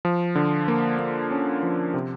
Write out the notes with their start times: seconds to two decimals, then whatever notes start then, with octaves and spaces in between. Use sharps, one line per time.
0.05 F3
0.35 D3
0.68 A#3
0.99 A#3
1.31 C#4
1.63 F3
1.94 C3